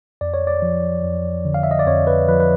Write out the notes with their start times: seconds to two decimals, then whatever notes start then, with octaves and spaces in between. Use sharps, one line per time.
0.21 F2 D5
0.34 C#5
0.47 D5
0.62 F3
1.03 F2
1.45 D3
1.54 F5
1.63 E5
1.71 D#5
1.79 D5
1.86 F2 C#5
2.07 B4
2.28 F3 B4
2.40 B4